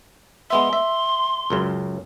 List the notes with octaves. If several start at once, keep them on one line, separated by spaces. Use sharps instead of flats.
G#3 B3 E5 C6
E5
C#2 F#2 C#3